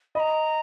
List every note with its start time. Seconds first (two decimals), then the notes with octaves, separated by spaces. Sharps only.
0.15 D#5 B5
0.19 A#5